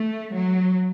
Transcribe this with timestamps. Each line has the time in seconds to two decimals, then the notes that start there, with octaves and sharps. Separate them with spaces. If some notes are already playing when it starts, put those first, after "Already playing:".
Already playing: A3
0.33 F#3